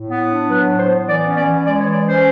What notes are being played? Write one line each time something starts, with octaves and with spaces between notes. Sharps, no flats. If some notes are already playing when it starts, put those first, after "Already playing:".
Already playing: A2
B3
D4
F#3 B4
A2
C5
B3
E3 D5
C#4
D5
E3
G#3 D5
C#5
E3
D5
C#4
C5